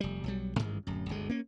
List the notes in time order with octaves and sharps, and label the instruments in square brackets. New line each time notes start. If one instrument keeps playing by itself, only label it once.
[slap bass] F1 G3
B1 F#3 G3
A1 G2 D#3 G#3
D1 F#2
G1 D2 G#3
A#3 C#4